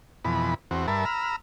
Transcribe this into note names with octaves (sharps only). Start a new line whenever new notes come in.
F2 B2 E3 B5
E2 C4 F#4
G2 A#4 E5 A5 B5
A#5 B5 E6 F6